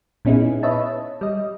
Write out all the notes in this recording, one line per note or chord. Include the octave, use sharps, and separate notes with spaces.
A#2 B3 C#4 D#4 E4 G#4
B4 C#5 D#5 E5 A5
G3 D#5